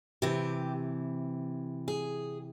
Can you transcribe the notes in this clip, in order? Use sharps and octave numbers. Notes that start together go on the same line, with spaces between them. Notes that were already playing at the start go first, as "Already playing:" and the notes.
C3 E3 G4
G#4